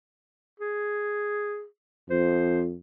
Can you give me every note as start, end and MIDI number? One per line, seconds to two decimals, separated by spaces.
0.59 1.65 68
2.10 2.76 41
2.10 2.62 72